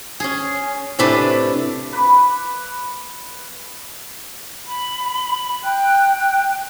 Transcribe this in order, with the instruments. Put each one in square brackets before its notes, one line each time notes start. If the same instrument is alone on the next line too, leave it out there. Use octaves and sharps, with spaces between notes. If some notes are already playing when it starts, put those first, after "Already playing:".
[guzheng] C#4 G#4
A2 C3 D4 B4 A5
[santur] B4 B5 D6
[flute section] B5
G5 F#6